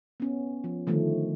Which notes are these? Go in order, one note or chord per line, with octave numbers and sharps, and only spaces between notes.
B3 C#4
F3
D3 D#3 F3 A3